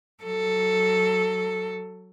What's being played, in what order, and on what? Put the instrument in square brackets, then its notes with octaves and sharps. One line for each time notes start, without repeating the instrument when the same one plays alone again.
[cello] F#3 A4